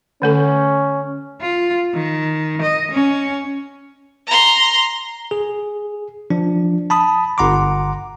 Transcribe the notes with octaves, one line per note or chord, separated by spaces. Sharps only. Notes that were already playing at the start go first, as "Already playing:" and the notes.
D3 A3 C#4 A4
F4
D#3
D#5
C#4
A#5 C6
G#4
F3 D4
A5 B5 D#6
G1 F#5 A#5 C6 D6